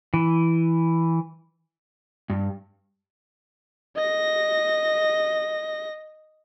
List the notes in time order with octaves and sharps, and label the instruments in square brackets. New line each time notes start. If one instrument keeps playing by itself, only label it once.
[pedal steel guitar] E3
[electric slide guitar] G2
[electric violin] D#5 A#6